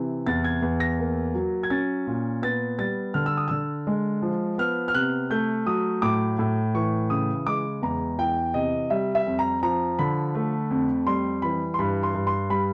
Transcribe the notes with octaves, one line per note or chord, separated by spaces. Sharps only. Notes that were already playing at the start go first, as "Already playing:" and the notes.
Already playing: C3 E3
E2 A6
G#6
E2
A#6
A#3
F#3
G#6
C#4 A6
A#2
B3 A6
G3 A6
D3 F6
E6
D#6
D3 E6
G#3
F3
B3 F6
F6
C3 F#6
A3 G6
F#3 D#6
A2 D6
A2
E3 C#6
C#3 D#6
G#3 D6
E2 A#5
E3 G5
C3 D#5
G3 E5
E5
F2
A#5
F3 A#5
D3 B5
A3
F2
G3 C6
E3 B5
C6
G2 B5
C6
G2
C6
G3 B5